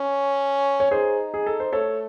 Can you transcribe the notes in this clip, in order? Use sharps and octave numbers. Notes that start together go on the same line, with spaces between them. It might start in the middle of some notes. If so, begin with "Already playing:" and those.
Already playing: C#4
C#5
D#4 G#4 C5
G#4
A4
C5
A3 A4 C#5